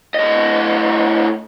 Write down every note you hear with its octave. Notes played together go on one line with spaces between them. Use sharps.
A2 D#5